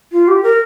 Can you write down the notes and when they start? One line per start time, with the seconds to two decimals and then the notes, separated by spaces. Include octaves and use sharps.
0.12 F4
0.28 G4
0.43 A#4